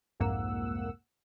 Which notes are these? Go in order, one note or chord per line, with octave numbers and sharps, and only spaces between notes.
C2 F2 G#2 A#3 F#5 E6